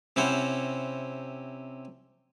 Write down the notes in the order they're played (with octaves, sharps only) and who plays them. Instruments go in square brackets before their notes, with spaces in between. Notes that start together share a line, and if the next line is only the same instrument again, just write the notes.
[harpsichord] C3 C#4 E4 C5 F#5